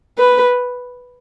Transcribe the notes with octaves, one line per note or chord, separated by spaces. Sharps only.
B4